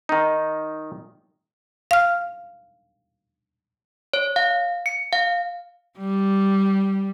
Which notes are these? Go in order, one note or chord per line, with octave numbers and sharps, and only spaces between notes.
D#3 D#4
F5 F6
C#5
F5
C#7
F5
G3